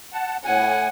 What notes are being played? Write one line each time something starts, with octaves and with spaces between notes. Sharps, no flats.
F#5 A5
A2 F#5 G#5